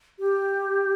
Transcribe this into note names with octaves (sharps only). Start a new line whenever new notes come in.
G4